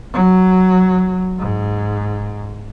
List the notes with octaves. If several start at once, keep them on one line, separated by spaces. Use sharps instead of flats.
F#3
G#2